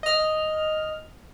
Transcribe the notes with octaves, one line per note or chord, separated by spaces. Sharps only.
D#5 F6